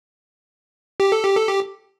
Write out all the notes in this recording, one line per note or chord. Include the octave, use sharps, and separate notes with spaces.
G4
A4
G4
A4
G4